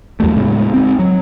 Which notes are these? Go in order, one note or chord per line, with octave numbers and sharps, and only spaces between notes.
E2 F#3 G3 A3
A2 C#3 G#3 B3
G#3 C4
F#3